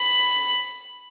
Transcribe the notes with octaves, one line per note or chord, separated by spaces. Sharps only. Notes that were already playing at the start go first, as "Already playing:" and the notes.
Already playing: B5